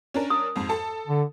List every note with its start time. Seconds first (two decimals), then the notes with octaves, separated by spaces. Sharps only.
0.14 C#4 D4 A#4
0.30 D#6
0.56 F2 G#2
0.69 A4 A5
1.07 D3